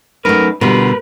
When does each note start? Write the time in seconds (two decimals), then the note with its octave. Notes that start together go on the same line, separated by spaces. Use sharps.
0.25 F#2 A3 D#4 A#4 B4
0.61 B2 D3 G3 F4 A#4 B4